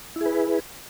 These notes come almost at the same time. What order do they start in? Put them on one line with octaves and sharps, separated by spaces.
E4 G#4 B4